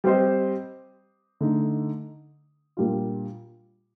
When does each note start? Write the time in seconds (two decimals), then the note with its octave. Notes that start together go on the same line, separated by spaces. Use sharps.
0.04 G3 C4 G4 C5 D#5
1.41 D3 A3 D#4
2.77 A#2 G3 D4 F4